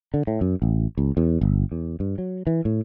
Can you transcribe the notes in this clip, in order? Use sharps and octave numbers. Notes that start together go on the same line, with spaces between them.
D3
A2
F#2
A1
C#2
E2
G1
E2
G2
F#3
E3
A2